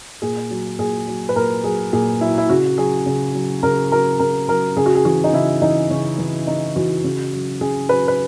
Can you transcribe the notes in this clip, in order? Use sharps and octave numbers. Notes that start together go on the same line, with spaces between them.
A#2 G#4
F#3
A#2 G#4
F#3
B4
A#2 A#4
F#3 G#4
A#2 G#4
F#3 E4
E4
C#3 F#4
F#3 G#4
C#3
F#3
C#3 A#4
F#3 A#4
C#3 A#4
F#3 A#4
C#3 G#4
F#4
G#4
E3 F#4
D#4
C#3 E4
E3 D#4
C#3 C#4
E3
C#3 D#4
E3 F#4
C#3
F#3
C#3 G#4
F#3 B4
B4